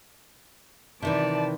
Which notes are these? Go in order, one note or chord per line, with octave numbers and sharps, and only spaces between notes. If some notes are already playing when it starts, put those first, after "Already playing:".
C3 D#3 E3 D5 A5